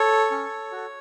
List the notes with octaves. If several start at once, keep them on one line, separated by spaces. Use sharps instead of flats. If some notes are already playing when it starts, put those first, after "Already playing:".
Already playing: A4 C#5
C#4
F#4 A4